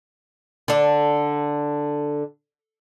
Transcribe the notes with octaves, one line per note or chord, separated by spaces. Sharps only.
D3 D4